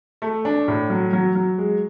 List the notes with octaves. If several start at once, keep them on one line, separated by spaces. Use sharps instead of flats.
A3
D4
A2
F#3
F#3
F#3
G#3